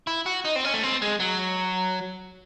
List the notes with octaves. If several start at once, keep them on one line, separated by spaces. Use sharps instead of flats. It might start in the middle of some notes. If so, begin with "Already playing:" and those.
E4
F#4
D#4
C4
C#4
A3
C4
G#3
F#3